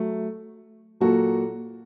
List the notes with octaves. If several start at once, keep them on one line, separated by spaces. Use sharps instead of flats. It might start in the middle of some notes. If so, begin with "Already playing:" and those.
Already playing: F#3 A3
A#2 F#3 A#3 F#4 A4